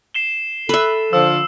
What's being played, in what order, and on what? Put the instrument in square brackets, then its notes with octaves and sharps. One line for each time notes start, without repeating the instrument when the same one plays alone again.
[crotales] C7 E7 G7
[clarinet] A4 [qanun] B4 E5
[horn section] D3 F3 [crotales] E6